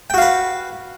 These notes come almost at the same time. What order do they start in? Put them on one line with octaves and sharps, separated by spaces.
G5 F#4 F5 B4